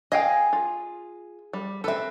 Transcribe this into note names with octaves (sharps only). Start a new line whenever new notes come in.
G#4 D#5 F5 G5
F4
G3
C4 A4 B4 E5